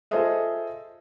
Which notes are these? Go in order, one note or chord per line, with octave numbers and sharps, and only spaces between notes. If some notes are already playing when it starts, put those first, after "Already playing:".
F4 G#4 A4 C5 D#5 E5